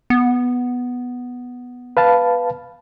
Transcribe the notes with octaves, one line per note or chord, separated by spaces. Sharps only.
B3
B4 F5 A5